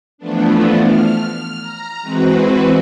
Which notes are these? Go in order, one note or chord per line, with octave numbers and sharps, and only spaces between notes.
E3 F3 A3 B3 D4
F6
A#5
E3 G#3 C4 F#4 B4